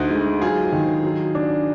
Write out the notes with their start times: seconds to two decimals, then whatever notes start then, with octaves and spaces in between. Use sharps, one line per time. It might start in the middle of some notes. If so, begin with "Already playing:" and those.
Already playing: D2 D#4 F#4
0.10 G#3
0.41 F#3 F4 G#4
0.72 D#3
1.03 F#3
1.35 D4